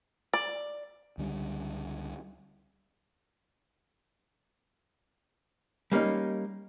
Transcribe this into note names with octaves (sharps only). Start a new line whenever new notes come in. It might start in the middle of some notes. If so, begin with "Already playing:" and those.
D5
C#2 D3 G3
G3 A#3 C#4 D#4